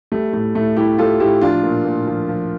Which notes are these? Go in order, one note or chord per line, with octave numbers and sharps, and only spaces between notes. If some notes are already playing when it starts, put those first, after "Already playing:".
G3 A3
A2 A3
A2 A3
G3 E4 G4
G3 F4 A4
A2 E4 G4
F3 D4 F4
A#2
A#2
F3
F3